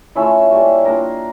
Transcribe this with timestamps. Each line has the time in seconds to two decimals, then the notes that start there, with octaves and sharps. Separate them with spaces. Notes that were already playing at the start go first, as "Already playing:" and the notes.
0.15 A3 C#4 E4 F4 E5
0.50 G3 A#3 C#4
0.85 A#3 D4 F4 A#4 A#5